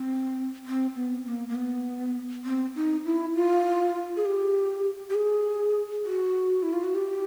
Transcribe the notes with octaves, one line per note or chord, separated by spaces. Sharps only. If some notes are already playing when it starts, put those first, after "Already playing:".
Already playing: C4
C4
B3
A#3
A#3
B3
C4
D#4
E4
F4
G#4
G4
G4
G#4
F#4
E4
F4
F#4
G4